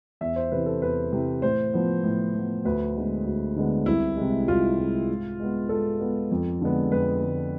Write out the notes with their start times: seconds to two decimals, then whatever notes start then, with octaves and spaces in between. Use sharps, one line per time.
0.21 E2 E5
0.36 C5
0.51 C3 E3 B4
0.66 A4
0.82 E2 B4
1.12 C3 E3
1.42 A2 C5
1.73 F3 B3
2.04 A2
2.34 F3 B3
2.65 D2 B4
2.96 D3 G#3 B3
3.26 D2
3.56 D3 G#3 B3
3.86 C2 E4
4.17 C3 G#3
4.48 C2 F4
4.78 C3 G#3
5.08 G#2
5.40 G#3 B3
5.69 G#2 A4
6.00 G#3 B3
6.31 F2
6.61 D3 G#3 B3
6.92 F2 B4
7.22 D3 G#3 B3